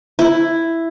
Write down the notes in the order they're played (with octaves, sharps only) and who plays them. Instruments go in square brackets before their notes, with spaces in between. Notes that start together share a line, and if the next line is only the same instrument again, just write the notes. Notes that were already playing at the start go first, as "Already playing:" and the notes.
[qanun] E4